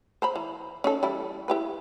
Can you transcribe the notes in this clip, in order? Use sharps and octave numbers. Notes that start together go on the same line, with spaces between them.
C5 A#5 B5
E3
C#4 D#4 A4
E3 G3 E4
E4 G4 B4